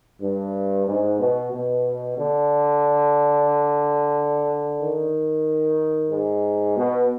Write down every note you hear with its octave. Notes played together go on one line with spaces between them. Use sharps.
G2
G#2
B2
B2
D3
D#3
G#2
B2